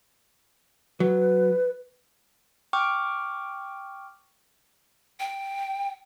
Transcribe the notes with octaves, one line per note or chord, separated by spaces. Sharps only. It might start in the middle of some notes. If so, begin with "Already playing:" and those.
F#3 B4
G5 C#6 D6 F6
G5